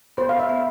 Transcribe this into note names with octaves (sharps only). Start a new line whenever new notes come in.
B3 C5
F5
E5
B3